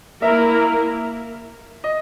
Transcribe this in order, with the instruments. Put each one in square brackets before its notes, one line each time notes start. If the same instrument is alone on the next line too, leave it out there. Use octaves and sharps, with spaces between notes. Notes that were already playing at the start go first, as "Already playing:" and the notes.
[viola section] A#3 E4 A#4 [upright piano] E5
[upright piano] D#5